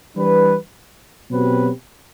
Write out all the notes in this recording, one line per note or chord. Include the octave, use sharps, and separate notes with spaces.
E3 G3 D4 G4 B4
B2 F#3 C4 G4 B4